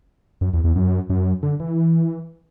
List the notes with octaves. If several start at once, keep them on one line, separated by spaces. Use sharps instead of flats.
F#2
E2
E2
F#2
F#2
D3
E3